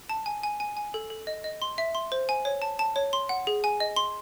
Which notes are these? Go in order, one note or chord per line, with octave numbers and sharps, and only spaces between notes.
A5
G#5
G#5
G#5
G#5
A4
A4
D#5
D#5
C6
E5
C6
C5
G#5
C#5
A5
A5
C#5
C6
F#5
G#4
G#5
D#5
C6